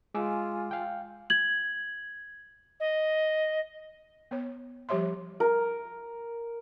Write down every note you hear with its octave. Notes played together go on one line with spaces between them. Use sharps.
G#3 F4 G#5 D6 E6
F5 G5
G#6 F#7
D#5
B3 C#5
F3 G3 G4 C#5 E5 C6
A#4